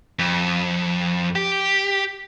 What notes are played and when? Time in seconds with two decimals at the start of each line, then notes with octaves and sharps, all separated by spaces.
0.19 F2
1.35 G4